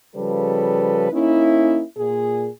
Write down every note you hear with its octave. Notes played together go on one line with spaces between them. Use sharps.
C#3 F3 G3 A4 B4
A#3 C#4 D#4 E4
A#2 G#4